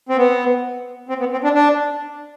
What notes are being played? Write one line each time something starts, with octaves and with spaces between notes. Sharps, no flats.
C4
B3
C4
B3
C4
D4
D4